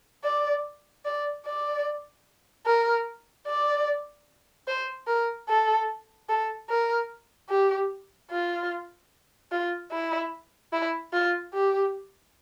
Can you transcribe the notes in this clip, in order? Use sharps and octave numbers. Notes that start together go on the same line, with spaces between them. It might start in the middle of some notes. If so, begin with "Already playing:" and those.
D5
D5
D5
A#4
D5
C5
A#4
A4
A4
A#4
G4
F4
F4
E4
E4
F4
G4